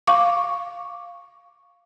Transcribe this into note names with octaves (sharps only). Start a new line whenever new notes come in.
F5 C#6 D6